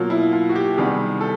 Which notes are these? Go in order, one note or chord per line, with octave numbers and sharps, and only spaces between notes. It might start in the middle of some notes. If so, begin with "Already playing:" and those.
Already playing: B2 F#3 A#3 F4
E4
F4
F#4
G4
C3 D#3 G3 B3 G#4
A4